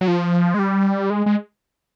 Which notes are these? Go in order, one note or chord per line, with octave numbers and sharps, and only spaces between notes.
F#3
F3
G#3
G3
G#3
G#3